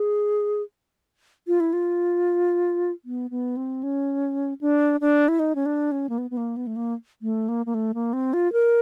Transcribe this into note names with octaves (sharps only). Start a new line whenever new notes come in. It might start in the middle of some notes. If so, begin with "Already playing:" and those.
Already playing: G#4
F4
E4
F4
B3
B3
C4
C#4
D4
D4
E4
D#4
C#4
D4
C#4
A#3
B3
B3
A#3
B3
A3
A#3
A3
A#3
A#3
A3
A#3
C4
F4
A#4